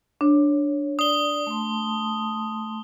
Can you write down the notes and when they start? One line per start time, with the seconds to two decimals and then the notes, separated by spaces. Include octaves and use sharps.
0.21 D4 C#5
0.99 D5 D#6 G7
1.47 A3 A5 C6